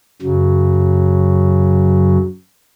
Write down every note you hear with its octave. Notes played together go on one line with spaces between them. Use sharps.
F#2 C#3 F#3